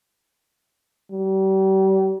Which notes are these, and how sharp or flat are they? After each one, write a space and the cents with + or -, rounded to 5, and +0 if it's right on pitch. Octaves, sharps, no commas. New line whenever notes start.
G3 -35